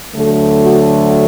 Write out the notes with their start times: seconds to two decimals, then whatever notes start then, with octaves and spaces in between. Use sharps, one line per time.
0.14 D2 D3 F#3 A3 A4
0.62 F#4